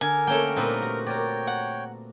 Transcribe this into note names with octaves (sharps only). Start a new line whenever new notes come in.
D3 A#4 G#5
A3 A#3 C#4 G5
A#2 G3 C4 D#4 B4
F#4
A#4 C#5 D5 G5
F#5